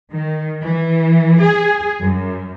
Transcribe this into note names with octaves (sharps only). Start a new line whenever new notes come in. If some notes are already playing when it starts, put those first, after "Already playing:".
D#3
E3
G#4
F#2